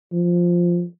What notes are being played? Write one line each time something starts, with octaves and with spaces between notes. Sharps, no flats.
F3